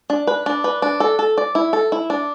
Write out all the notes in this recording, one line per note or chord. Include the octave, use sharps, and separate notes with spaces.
D4
B4
D4
B4
D4
A4
A4
D5
E4
A4
E4
D4